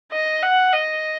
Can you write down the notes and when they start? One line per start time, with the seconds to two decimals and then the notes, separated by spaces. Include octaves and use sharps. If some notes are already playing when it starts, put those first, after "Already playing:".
0.12 D#5
0.43 F#5
0.73 D#5